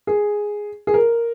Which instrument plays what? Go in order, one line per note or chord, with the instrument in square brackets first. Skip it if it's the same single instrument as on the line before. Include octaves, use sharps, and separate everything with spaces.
[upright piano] G#4
G#4
A#4